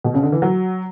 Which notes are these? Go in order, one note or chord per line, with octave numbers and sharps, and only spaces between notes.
B2
C#3
D3
E3
F#3